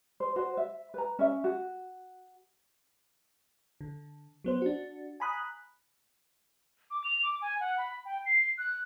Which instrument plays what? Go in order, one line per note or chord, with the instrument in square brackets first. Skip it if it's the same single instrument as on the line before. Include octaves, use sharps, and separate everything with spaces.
[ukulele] C5
F#4 C5
E5
B4 A#5
C#4 E5
F#4
[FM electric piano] D3
F#3 B3 C5
D4 F#4
G#5 A#5 B5 D#6 F#6
[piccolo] D6
F7
D6
G#5
F#5
B5
G5
C7
F#6